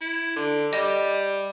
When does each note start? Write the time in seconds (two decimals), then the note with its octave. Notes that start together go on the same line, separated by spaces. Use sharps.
0.01 E4
0.36 D3
0.73 G3 D#5